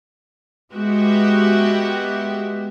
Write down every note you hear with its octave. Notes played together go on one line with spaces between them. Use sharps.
G#3 B3 F#4 G4 E5